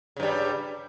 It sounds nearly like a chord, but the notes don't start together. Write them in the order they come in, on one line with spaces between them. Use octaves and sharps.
C#3 G2 G3